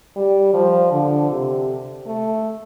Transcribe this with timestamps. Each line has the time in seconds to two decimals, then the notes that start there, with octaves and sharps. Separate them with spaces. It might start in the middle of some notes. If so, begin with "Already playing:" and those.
0.16 G3
0.53 F3
0.92 D3
1.31 C3
2.06 A3